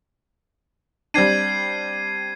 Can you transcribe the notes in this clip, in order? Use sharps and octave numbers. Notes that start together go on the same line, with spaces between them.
G3 C4 D4 G#6 C7 D#7